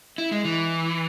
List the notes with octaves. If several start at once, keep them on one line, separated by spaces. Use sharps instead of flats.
E4
G#3
E3